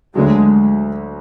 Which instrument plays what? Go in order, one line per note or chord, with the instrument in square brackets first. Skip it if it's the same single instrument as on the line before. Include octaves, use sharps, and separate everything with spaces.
[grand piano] D2 D3 F#3 [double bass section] G#3